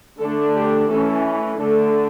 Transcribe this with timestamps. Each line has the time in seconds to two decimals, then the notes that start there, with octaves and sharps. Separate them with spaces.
0.19 D3 A3 D4 A4
0.55 G4
0.89 E3 A3 C#4 A4
1.59 D3 A3 D4 A4